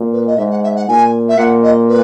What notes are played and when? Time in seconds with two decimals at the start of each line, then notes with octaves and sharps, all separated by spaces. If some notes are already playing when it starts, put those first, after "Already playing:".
Already playing: A#2
0.12 B4
0.26 D#5
0.38 G#2 E5
0.50 F#5
0.63 E5
0.76 F#5
0.88 A#2 G#5
1.28 E5
1.37 A#2 F#5
1.63 D#5
1.88 B4